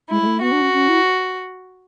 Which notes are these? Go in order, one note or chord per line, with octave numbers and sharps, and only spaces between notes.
G#3 E4
G#3
A3
B3 F#4
D4
C#4
C#4
E4